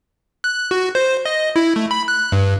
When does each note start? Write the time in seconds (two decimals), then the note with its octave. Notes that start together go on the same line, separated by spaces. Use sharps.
0.44 F#6
0.71 F#4
0.95 C5
1.25 D#5
1.56 E4
1.76 A3
1.91 B5
2.08 F#6
2.32 G2